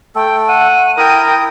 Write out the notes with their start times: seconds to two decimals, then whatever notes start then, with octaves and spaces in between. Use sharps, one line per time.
0.15 A3 A4 G5
0.49 F#5 D#7
0.98 E4 A#4 G5 D#6